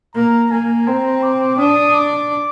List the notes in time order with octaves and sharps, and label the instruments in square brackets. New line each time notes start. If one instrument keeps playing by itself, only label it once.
[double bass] A#3 [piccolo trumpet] A#5
[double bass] A#3 [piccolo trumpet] G#5
[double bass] C4 [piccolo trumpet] A#5
[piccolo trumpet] D6
[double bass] D4 [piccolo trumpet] D#6
[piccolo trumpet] D6